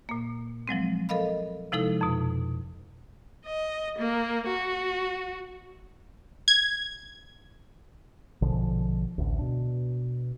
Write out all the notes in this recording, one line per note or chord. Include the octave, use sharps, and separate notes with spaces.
A#2 A#3
F3 F#3 G#3 C4
A4 A#4 D#5 F5 B5
C3 F3 G#3 D#4 E4 A4
F2 B2
D#5
A#3
F#4
G#6
A#1 B2 D3 F3
A1 D2
B2 D4